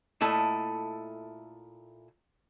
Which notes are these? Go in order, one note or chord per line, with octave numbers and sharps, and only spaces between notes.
A#2 A3 E4 A4 D#5